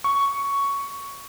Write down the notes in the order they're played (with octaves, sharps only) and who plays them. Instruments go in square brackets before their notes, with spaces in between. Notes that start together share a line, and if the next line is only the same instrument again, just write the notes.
[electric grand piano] C#6